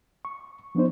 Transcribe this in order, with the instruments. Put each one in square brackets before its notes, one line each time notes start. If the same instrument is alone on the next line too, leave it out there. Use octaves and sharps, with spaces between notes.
[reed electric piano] C#6
F3 B3 D4 D#4 C5